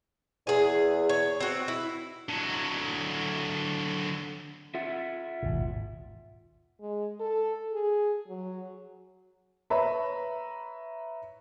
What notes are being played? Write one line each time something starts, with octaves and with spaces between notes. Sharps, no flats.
E2 G#4 G#5
C#5
C4 F#4
E4
D3 F#3
F4 E5 F#5
G#1 D#2 B2
G#3
A4
G#4
F#3
B4 C#5 E5 A#5 B5